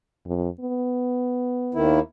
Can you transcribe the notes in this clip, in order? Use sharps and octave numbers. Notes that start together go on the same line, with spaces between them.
F2
B3
D#2 D#3 E4